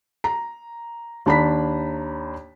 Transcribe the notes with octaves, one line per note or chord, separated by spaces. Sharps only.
A#5
D#2 D4 A#5 B5 B6